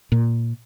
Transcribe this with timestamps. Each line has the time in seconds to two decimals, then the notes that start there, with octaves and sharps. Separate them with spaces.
0.12 A#2